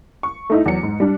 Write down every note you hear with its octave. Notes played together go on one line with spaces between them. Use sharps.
C#6
A3 D#4 E4
E2 F#3 C#7
G#2
G3 D4